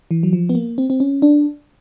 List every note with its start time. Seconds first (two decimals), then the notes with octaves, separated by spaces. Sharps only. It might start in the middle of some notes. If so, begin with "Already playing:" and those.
0.11 E3
0.23 F#3
0.33 F3
0.49 B3
0.55 A#3
0.78 C4
0.90 C4
1.00 C#4
1.22 D4